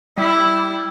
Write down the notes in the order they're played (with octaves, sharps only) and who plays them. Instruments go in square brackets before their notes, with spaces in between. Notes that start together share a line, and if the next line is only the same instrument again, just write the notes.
[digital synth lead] G3 [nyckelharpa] E4